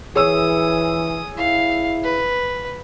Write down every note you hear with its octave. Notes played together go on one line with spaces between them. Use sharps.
E3 G#4 C#5 D#6 E6
E4 F5
B4